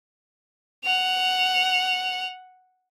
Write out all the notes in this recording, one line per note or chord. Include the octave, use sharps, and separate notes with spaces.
F#5 F7